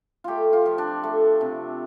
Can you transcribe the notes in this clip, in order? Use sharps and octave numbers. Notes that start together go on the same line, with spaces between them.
A3 F4 G4
F4
F3
D4
A3
C3